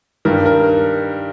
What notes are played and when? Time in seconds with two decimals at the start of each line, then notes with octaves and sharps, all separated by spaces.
0.25 G2 D#3 G3 A#4
0.46 A#4